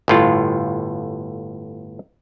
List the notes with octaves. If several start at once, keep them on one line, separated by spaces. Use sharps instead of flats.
G1 A2 F4